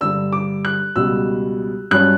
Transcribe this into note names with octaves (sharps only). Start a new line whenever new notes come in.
G2 D3 G3 D4 E6
D6
F#6
C#2 B2 G3 E6
G2 F#3 C#4 F#6